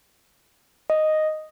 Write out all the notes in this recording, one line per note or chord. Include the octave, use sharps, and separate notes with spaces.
D#5